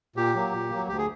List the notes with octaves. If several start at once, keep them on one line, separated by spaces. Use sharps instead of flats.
A#2 G4
F#3 A#3
A#2
F#3 A#3
D2 G4
G#4